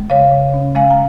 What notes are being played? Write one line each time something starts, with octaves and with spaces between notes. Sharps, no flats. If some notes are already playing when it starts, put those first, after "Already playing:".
Already playing: G#3
C#3 C#5 F5
C#3
C#4
G#3 F5 G#5
A#5